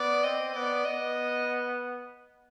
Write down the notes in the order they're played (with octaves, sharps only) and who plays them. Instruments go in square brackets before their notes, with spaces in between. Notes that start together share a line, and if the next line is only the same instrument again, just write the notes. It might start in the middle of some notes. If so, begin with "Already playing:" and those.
Already playing: [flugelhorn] B3 [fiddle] D5
[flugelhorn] C4 [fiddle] D#5
[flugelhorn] B3 [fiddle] D5
[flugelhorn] B3 [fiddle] D#5